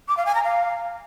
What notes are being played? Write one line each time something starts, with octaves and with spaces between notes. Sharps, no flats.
D6
F5
G#5
A#5
F5